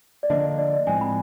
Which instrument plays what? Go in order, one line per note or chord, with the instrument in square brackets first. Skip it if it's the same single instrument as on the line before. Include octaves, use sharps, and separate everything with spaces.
[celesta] D5
[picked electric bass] D3 F3 A#3 D4 [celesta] D#5
[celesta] D5
[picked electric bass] A2 F3 G#3 C4 [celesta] G#5
[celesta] B5